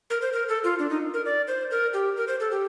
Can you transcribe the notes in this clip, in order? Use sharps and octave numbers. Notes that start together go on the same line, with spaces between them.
A#4
C5
A#4
A4
F4
D4
D#4
A#4
D5
C5
A#4
G4
A#4
C5
A4
G4